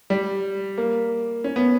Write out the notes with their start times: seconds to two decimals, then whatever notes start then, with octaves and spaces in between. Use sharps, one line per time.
0.10 G3
0.78 A#3
1.44 C#4
1.56 B3